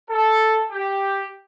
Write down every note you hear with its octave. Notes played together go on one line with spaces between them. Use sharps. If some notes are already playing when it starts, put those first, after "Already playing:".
A4
G4